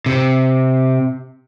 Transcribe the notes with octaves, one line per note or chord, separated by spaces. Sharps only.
C3